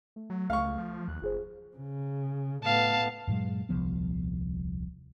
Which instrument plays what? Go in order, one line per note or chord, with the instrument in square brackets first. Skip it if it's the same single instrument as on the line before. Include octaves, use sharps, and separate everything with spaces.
[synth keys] A3
[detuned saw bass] F#3
[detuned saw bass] C#2 [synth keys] A3 [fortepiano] F5 C#6
[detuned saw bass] F3
[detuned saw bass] D#2 [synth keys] F#6
[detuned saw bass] F#1 [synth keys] F4 G#4 C5
[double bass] C#3
[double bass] A2 B3 [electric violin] F5 A5
[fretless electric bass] G2 A#2 F#3 G#3
D#1 C2 F3 B3